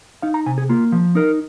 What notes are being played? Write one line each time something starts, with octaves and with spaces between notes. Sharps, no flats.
D#4 F5
A#5
C3 G#5
G#4
A#3 F4
F3
D#4 A#4